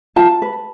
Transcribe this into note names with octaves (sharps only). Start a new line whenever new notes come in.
F4 A5
B4